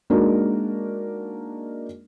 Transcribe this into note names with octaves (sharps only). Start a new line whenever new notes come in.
G#3 A#3 D4 D#4 F#4 A#4